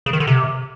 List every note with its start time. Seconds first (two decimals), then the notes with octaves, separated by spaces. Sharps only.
0.06 C#3
0.13 D#3
0.20 D3
0.27 C3